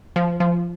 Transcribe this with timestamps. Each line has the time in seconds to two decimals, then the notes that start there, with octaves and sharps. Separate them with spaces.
0.16 F3
0.40 F3